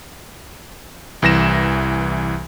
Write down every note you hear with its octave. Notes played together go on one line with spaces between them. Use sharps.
C2 E3 A#6 E7